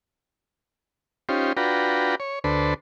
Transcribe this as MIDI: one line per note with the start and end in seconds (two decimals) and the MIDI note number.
1.29 1.53 61
1.29 1.53 63
1.29 1.53 65
1.29 1.53 67
1.29 1.53 72
1.57 2.15 62
1.57 2.15 65
1.57 2.15 66
1.57 2.15 71
1.57 2.15 79
1.57 2.15 82
2.20 2.39 73
2.44 2.74 38
2.44 2.74 62
2.44 2.74 69
2.44 2.74 71
2.44 2.74 72